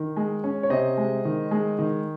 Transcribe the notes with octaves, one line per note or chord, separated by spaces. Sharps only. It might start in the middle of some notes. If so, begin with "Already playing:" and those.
Already playing: D#3
G#3
C#4
C#5
C3 C5 D#5
G#3
D#3
G#3
D#3